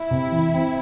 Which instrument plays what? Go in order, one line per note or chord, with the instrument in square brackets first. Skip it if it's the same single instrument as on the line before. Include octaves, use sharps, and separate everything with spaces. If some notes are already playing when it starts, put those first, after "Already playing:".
Already playing: [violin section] E4
[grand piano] C3
E3
C4